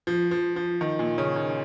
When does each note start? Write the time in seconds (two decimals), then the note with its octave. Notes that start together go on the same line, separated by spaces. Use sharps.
0.07 F3
0.31 F3
0.56 F3
0.81 D#3
0.99 A#2
1.18 C#3
1.36 D#3